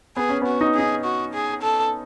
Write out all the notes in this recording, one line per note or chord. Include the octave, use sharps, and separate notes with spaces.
B3 G#4
C#4
B3 F#4
D#4
D#4 G#4
F#4
G#4
A4